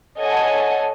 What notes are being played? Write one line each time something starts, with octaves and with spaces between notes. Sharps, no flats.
A4 C#5 D#5 F#5 G#5 A5